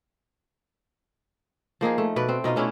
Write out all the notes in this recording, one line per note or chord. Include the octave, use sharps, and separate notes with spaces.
F3 A#3 D#4 G#4
A3
B2 B4 D5
C4
B2 D#4 F4 D#5
A3 C#4 D4 E4